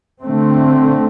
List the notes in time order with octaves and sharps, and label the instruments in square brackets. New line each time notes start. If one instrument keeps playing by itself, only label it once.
[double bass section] D3 A3 C4